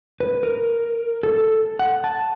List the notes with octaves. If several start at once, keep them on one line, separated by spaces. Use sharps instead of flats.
B4
A#4
A4
F#5
A5